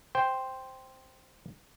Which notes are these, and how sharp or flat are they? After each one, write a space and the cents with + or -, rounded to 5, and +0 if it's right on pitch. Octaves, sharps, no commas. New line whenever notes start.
C5 +0 G5 +0